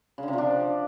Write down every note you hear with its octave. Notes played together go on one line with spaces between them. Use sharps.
C#3
D3
C3
F3
D4